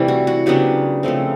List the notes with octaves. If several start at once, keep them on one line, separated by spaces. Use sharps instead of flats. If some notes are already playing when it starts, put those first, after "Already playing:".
Already playing: C3 E3 G3 A3
F#4
F#4
C#3 F#3 B3 D4 G4
C#3 F3 A3 C4